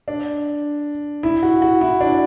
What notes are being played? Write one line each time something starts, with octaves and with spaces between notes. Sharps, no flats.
D4
E4
F#4
F#4
E4
D4